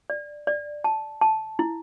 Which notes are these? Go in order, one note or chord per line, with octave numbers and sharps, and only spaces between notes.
D5
D5
A5
A5
E4